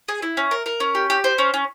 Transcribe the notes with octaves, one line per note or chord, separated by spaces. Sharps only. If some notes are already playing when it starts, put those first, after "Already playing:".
G#4
E4
C#4
A#4
A#4
C#4
G4
G4
C5
C#4
C#4